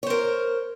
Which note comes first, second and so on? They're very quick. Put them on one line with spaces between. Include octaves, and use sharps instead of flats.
C#5 C5 A#4